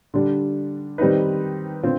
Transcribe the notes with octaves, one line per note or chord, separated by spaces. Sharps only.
D3 G3 D4
D#3 G3 C4 D#4 B4
D3 C4 F4